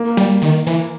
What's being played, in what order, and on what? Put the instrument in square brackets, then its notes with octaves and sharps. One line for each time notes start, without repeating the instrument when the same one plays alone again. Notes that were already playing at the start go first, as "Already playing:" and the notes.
Already playing: [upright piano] A#3
[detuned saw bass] G3
D#3
E3